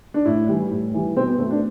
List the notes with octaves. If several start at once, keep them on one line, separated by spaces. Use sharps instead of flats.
D4
A2 E4
E3 G3
A2
E3 G3
B2 C4
B3
A3 C4
D4